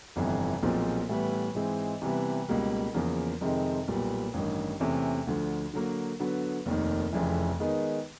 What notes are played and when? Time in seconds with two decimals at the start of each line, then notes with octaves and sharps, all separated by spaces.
0.16 G1 F2 C3 E3
0.62 B1 A#2 F3 G#3 C4
1.09 A2 E3 G3 B3
1.55 G#2 E3 G#3 C4
2.02 C3 E3 G3 B3
2.49 C#2 B2 G3 A#3
2.94 E2 C#3 F3 A#3
3.41 F2 C3 D#3 G#3 C4
3.88 B1 A#2 G3 B3
4.34 A1 G2 D#3
4.80 E2 C3 E3 A3 C#4
5.27 D2 D3 F3
5.73 D3 F#3 A#3
6.20 D3 F#3 B3
6.66 F1 D#2 D#3
7.13 F1 F2 C#3 E3
7.60 D#3 G#3 B3 D#4